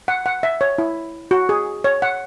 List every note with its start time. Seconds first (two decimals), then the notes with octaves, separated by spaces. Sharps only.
0.08 F#5
0.26 F#5
0.43 E5
0.61 C#5
0.78 E4
1.31 F#4
1.49 G#4
1.84 C#5
2.02 F#5